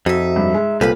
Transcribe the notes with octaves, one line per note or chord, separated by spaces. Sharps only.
F2 D#4 F#4 E5
G2
G#3
C2 A#2 A4 B4 F5 B5